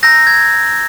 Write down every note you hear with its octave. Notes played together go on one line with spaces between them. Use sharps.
A#5 E6 G6 A#6
G#6